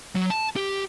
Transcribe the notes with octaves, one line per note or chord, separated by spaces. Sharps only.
F#3
A5
G4